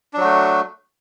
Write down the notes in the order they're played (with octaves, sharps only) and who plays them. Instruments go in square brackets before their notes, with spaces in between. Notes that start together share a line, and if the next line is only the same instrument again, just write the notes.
[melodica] D4
F#3
F#4
A3